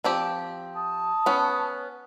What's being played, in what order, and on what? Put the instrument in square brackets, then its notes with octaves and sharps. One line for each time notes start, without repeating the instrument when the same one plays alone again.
[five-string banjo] F3 C4 G4
[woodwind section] A5 D#6
[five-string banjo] B3 C#4